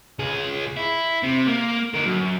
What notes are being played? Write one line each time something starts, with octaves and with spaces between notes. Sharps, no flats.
C#2 G#4
E4
C3
A#3
D3 A#4
F#2